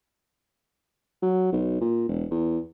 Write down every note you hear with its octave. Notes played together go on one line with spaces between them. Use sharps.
F#3
B1
A#2
E1
E2